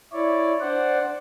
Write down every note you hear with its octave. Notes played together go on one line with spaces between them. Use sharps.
E4 C#5 D5
D4 C5 D5 F#5